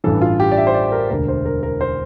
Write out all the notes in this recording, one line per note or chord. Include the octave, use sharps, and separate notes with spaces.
A1 G2 E3 A4
F4
G4
D5
E5
C5
D5
A#4
E1 D2 D3 A#4
C5
A#4
A#4
C5